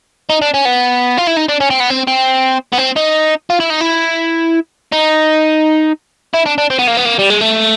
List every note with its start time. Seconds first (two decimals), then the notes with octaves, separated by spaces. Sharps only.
0.30 D#4
0.42 D4
0.54 C#4
0.65 B3
1.17 F4
1.27 E4
1.36 D#4
1.48 D4
1.60 C#4
1.70 C4
1.80 B3
1.90 C4
2.08 C4
2.73 B3
2.79 C4
2.97 D#4
3.50 F4
3.60 E4
3.70 D#4
3.81 E4
4.93 D#4
6.34 E4
6.46 D4
6.58 D4
6.70 C4
6.79 B3
6.87 A#3
6.97 B3
7.05 A#3
7.19 G3
7.30 G#3
7.41 A3